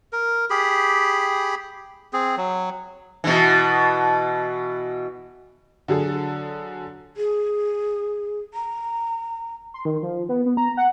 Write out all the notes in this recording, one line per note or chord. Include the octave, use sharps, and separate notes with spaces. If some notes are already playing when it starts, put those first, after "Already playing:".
A#4
G4 G#4 B5
C4 G#4
F#3
B2 E3
D3 F#3 G#4 A4
G#4
A#5
C6
D#3
F3
B3
B3
A#5
F#5